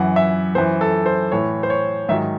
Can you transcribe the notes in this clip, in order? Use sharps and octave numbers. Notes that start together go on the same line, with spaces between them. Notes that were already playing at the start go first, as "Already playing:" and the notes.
Already playing: F#2 E3 F#5
E5
F#2 E3 C5
A4
C5
A2 E3 C#5
C5
C#5
G#2 D#3 F#3 E5